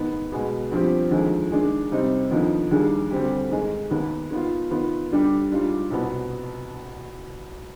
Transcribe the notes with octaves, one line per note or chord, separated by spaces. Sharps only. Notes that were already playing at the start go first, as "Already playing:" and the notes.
Already playing: G#2 D#3 B3
B2 G#3 B3
G2 F3 C4 G4
D#2 D3 F3 G#3
D#3 G#3 D4 G#4
C3 G3 C4 D#4
D#2 D3 F3 B3 D#4
D#2 D#3 G3 D4 G#4
D2 D3 G3 C4 G4
G#2 D#3 G#3
D#2 D#3 B3
D#3 B3 F4
D#3 B3 F4
D3 G3 D4 G4
G#2 G3 D4 F4
C2 B2 B3